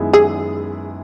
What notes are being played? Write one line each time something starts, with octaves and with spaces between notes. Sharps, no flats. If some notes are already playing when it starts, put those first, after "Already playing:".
Already playing: F#2 D#3 G#3 B3 E4
G#4